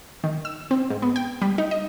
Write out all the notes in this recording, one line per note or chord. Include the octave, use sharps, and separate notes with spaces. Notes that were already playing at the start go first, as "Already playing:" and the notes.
D#3
E6
C4
G#2
B3
G5
G3
D#4
D#5